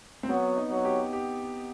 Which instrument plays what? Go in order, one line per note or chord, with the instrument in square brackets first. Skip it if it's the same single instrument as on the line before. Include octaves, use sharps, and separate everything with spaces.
[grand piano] C4
[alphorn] F#3 [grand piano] B3
[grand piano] D#4
[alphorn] F#3
[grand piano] G4
G4